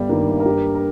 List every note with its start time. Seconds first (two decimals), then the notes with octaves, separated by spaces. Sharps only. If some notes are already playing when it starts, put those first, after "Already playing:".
Already playing: G1 G3
0.09 G2 D#3 A#3
0.40 A#4
0.45 G2 G4
0.75 A#4